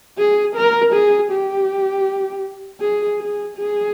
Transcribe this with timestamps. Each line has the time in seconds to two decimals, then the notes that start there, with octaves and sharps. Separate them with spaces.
0.18 G#4
0.56 A#4
0.93 G#4
1.31 G4
2.80 G#4
3.19 G#4
3.57 G#4